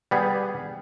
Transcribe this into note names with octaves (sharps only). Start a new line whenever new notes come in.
G3 B3 G#4